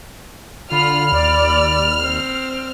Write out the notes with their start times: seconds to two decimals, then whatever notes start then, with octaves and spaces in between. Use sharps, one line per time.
0.72 D3 F4 B5 F6
1.12 D#2 D5
2.00 C4